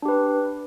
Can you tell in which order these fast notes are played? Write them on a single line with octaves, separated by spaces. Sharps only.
D4 G4 B4